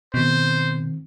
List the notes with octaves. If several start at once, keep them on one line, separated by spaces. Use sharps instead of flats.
B2 D#3 C4 C5